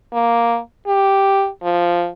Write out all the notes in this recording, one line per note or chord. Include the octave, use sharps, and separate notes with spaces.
A#3
G4
F3